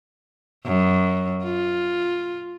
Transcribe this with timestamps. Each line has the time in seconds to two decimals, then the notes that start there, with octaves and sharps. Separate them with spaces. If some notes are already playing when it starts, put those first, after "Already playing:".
0.66 F#2
1.44 F4